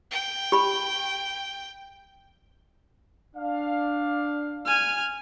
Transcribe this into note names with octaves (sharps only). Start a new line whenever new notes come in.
G5
G4 B5
D4 F5
G#5 F6